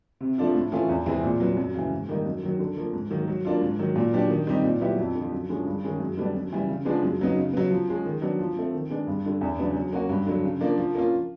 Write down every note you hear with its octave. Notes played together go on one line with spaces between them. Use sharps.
C3
F3 A3 D4 F4
A2
E3 A3 C#4 F4
E2
C3 E3 G#3 C4
A#2
F#3 B3
F#2
C#3 E3
G#2
D#3 G3 A#3 D#4
F#2
D#3 F#3
D3
F3 A#3
G#2
D#3 F#3 A#3
F#3
A#3 D4 F4
G#2
D#3 F#3
A#2
F#3 B3 D4 G4
D#3
G3 C4 D#4 G4
A#2
F#3 B3 E4 G4
F2
D3 F3
F#2
D3 F3 G#3 C#4
G2
D#3 G#3 C#4
F#2
D3 G3 B3 D4
F#2
C#3 E3 G3
C#3
F3 G#3 B3 D4
F#2
C#3 F#3 B3 D#4
C#3
F#3 B3
F3
G#3 C#4
D#3
F#3 B3 D4
F3
A3 C4
D#3
G#3 B3 D4
G2
D3 G3
E2
C#3 F#3 B3 D4
F#3
A#3 C#4 F#4
G2
D3 F#3
C#3
F3 A#3 D4
F3
A#3 C#4 F4